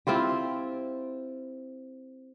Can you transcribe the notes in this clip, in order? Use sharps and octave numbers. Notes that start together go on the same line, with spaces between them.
C4 E4 F4 G4